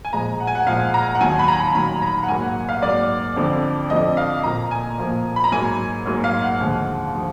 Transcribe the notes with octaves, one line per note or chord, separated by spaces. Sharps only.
G#5
A#2 F3 G#3 A#5
F#5
G#5
F#5
A#2 F3 G#3 F5
A#5
F#5
D#2 D#3 F#3 G#5
B5
A#5
D#2 D#3 F#3 B5
A#5
F#5
G#2 F#3 A#3 G#5
F#5
F5
G#2 F#3 A#3 D5
F2 D3 F3
F2 D3 F3 D#5
F5
A#2 F3 A#3 A#5
G#5
A#2 F3 A#3
B5
A#5
G#2 F#3 A#3 G#5
G#2 F#3 A#3
F5
F#5
D#2 D3 F3 G#3
D3 F3